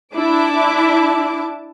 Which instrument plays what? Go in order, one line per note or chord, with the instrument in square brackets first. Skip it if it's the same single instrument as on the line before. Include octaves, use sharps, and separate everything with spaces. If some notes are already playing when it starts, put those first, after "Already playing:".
[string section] D4 E4 A5 D6